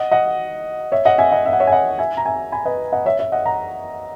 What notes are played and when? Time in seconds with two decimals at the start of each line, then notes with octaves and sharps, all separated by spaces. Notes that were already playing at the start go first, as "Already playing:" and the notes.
Already playing: D#5 F#5
0.11 D#5 F#5
0.92 C#5 E5
1.05 D#5 F#5
1.18 E5 G#5
1.32 D#5 F#5
1.46 E5
1.53 F#5
1.60 C#5 E5
1.67 G#5
1.72 D#5 F#5
1.99 E5 G#5
2.17 A#5
2.26 E5 G#5
2.52 G#5 B5
2.65 B4 D#5
2.92 D#5 F#5
3.06 C#5 E5
3.19 C#5 E5
3.32 D#5 F#5
3.46 F#5 A#5